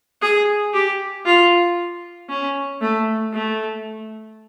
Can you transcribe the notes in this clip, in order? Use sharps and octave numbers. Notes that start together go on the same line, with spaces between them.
G#4
G4
F4
C#4
A3
A3